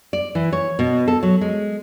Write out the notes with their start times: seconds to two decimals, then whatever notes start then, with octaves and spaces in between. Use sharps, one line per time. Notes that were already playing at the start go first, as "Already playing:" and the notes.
0.13 D5
0.35 E3
0.53 C#5
0.79 B2
1.08 A4
1.23 F#3
1.41 G#3